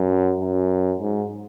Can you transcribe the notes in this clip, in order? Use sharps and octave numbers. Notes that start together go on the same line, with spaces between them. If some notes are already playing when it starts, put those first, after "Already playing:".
Already playing: F#2
F#2
G#2